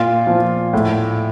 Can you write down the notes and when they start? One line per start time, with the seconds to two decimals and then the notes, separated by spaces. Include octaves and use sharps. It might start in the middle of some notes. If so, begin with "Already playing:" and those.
Already playing: A#2 F4
0.27 F3
0.73 A2